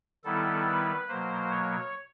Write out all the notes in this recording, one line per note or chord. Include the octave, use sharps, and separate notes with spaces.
D#3 G3 B3 E4 A4
B4
B2 F#3 A#3 C5
C#5